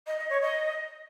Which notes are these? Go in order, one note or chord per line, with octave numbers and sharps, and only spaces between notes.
D#5
D#5
C#5
D#5